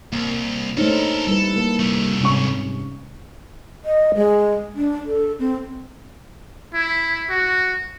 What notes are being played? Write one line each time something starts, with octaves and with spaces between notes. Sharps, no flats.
C2 A#3
A3 D4 D#4 A4 A#4 C5 C#5
G3 E4 A4 B4
A#3
C2 G3 A3
G#2 C3 C#4 C#6
D#5
G#3
D4
A4
C4
E4
F#4